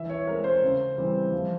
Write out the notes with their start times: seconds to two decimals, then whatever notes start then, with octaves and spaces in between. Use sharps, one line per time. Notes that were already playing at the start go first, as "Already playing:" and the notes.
Already playing: E3 E5
0.09 C#5
0.27 G#3 C4 A#4
0.44 C5
0.62 C#3
0.98 E3 G3 C4
1.32 F3